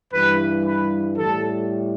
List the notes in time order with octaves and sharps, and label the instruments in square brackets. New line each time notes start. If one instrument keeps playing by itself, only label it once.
[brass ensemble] G2 E3 G3 B4
B4
A2 G3 A4